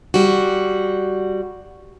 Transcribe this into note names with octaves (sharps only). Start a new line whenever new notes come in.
G3 F#4